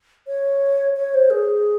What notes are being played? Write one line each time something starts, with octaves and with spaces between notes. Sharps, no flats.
C#5
C#5
C5
G#4